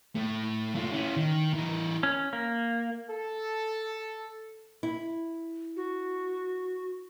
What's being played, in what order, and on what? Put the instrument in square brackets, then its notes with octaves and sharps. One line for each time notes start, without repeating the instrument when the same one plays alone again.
[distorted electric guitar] A2 A3
A3 F4
C#4 E4
D#3
E3 A#4
[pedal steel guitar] C#4
A#3
[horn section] A4
[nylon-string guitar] E4
[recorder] F#4